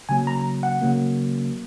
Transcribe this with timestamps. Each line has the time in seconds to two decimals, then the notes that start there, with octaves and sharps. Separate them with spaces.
0.09 C#3 F#3 A#3 G#5
0.27 A#5
0.63 F#5
0.82 C#3 F#3 A#3